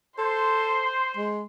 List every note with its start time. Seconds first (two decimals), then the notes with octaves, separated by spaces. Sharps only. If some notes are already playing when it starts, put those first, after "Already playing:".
0.19 A4 C5 C6
1.17 G#3